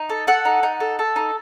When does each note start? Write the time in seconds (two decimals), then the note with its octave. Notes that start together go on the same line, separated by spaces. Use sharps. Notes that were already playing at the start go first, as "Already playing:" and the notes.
Already playing: D#4
0.09 A4
0.27 A4 F#5
0.45 D#4
0.63 D#4
0.80 A4
0.99 A4
1.16 D#4